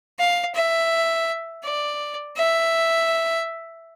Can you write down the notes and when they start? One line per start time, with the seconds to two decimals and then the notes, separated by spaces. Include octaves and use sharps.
0.19 F5
0.55 E5
1.64 D5
2.37 E5